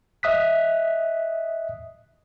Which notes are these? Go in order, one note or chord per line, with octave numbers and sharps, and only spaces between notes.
D#5 E5 D#6 F#6 B6